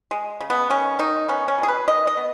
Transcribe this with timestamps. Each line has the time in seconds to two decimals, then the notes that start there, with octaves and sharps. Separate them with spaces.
0.11 G#3
0.40 C#3
0.50 B3
0.70 D#3 C#4
0.99 D#3 D#4
1.28 B3 C#4
1.48 C#4
1.58 B2
1.63 G#4
1.68 B4
1.88 D#3 D#5
2.07 D#5
2.17 B3